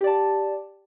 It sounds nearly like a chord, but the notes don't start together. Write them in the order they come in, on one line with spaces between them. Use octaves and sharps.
G4 D5 A5